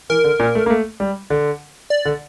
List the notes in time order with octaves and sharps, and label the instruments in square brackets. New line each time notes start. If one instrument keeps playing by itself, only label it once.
[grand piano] E3 [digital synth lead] A#4
[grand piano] D3
A#2
A3
A#3
A3
G3
D3
[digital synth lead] D5
[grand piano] D3